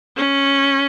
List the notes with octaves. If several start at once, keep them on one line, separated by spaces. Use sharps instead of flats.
C#4